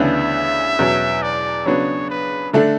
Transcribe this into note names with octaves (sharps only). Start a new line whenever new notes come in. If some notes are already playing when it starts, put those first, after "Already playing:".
Already playing: D2 C#3 E3 B3 D4 E5
E2 B2 F#3 C#4
D5
C#3 F#3 B3 D4 C#5
B4
D3 A3 D4 A4